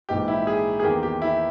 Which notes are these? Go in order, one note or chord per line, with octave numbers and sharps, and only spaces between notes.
A#1 G#2 E3 G#3 G4
E4
G#4
G#4
E2 D#3 A#3 G4
G4
E4